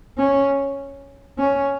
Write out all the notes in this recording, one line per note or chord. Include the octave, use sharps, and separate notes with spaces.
C#4
C#4